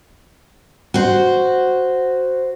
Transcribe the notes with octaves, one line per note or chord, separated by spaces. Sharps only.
F#4 C5